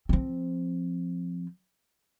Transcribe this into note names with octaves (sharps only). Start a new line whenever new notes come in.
F3 C4